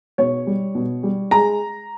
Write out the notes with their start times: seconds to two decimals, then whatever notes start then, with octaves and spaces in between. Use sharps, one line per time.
0.18 B2 C#5
0.47 G3
0.75 B2
1.03 G3
1.31 G#3 A#5